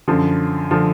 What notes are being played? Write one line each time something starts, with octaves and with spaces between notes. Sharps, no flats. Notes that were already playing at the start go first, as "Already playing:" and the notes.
F#2 D3 F3
D3 F3